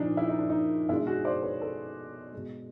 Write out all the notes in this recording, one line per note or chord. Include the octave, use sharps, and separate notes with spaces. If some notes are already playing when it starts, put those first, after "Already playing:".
Already playing: A#2 F3 D4 D#4
E4
D#4
D4
D#4
B2 G#3 D4 E4
F#4 G#4
C5 D5
B4 C#5
A4 B4
B2 G#3